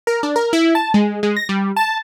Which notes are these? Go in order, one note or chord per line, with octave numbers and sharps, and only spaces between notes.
A#4
D4
A#4
E4
A5
G#3
G#3
A#6
G3
A5